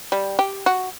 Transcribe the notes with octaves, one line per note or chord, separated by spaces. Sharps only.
G3
G4
F#4